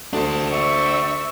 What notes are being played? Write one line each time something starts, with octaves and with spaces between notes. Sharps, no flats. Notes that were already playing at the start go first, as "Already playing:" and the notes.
D2 D4 C5 A5
D5 E5 C#6